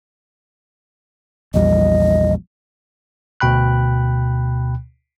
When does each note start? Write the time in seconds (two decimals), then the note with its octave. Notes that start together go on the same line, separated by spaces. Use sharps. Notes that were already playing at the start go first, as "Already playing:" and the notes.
1.54 A#1 E2 G3 D#5
3.40 D2 B2 G5 B5 F#6